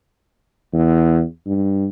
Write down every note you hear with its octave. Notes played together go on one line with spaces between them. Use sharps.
E2
G2